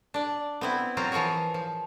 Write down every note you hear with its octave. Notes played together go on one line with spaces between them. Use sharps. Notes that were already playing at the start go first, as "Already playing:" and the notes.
D4 D5
B3 C4 E4
F#3 C4 F4 A#4
E3 F3 F4 G#4 C#5
F3